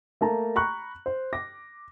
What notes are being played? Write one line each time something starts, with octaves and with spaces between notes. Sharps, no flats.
A3 A#3 A5 A#5
A#5 B5 C#6 F#6
C5
D6 A#6